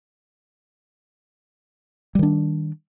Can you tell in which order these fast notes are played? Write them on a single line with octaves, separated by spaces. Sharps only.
G3 D#3 D4